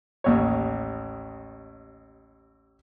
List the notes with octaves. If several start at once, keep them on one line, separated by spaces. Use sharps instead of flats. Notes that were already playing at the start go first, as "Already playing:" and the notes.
A1 D#2 C#5